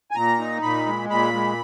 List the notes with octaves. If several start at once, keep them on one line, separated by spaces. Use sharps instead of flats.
G#5
A#2 A#5
D#4
A#2 B5
G#3
A#2 B5
G#3